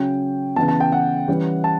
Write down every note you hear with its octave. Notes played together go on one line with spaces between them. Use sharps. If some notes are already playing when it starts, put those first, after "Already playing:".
Already playing: C#3 F#3 C#4 G5
C#3 E3 B3 A5
A5
G5
F#5
E3 G3 C#4
A5